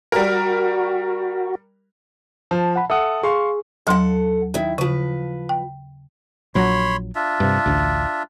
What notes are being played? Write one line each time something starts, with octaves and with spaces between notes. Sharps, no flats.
G3 F#4 A#4
F3 A5
F#5 B5
A4 E5 F#5 D#6
G#4 F5 C6 C#6
D#2 F#3 A4 F#5 C6
D#3 E4
C#3 F3 B4
G5
A#1 F#3 C#5 B5 C6
D4 F4 E5
G2 C3
A1 D2